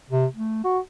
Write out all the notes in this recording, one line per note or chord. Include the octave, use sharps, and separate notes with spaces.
C3
A3
F#4